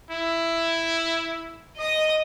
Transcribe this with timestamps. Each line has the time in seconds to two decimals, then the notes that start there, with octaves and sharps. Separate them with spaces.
0.10 E4
1.77 D#5 D#6